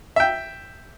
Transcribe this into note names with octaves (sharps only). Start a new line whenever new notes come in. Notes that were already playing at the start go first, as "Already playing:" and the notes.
E5 G5